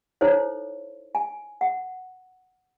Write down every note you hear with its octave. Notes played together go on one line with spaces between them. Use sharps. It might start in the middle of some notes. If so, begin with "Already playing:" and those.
D#4 E4 A4 C5 C#5
G#5
F#5